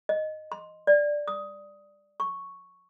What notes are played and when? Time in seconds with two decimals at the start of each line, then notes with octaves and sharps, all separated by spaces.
0.09 D#5
0.52 C6
0.87 D5
1.28 D#6
2.20 C#6